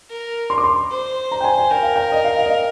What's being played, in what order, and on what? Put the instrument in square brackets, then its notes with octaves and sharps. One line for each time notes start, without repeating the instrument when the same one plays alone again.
[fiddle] A#4
[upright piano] C6
D6
C6
[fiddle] C5
[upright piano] A#5
G5
G#5
G#5
[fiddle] A#4 [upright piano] G5
[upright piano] F5
G5
D#5
F5
F5
D#5